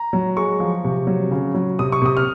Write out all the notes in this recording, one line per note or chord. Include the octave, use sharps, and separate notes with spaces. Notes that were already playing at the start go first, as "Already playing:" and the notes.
Already playing: A#5
F#3
G#3 C#6
F3
C3
F#3
C#3
F#3
C3 D#6
C#6
C3 D#6
F6